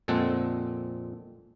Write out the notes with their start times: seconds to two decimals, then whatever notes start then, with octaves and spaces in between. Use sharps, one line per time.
0.08 F2 A#2 G#3 C4 A4 F#5